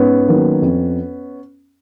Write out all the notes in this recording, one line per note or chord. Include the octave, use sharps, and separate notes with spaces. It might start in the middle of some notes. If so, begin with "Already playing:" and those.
Already playing: G#2 B3 C#4
D#3 F#3 A#3
F2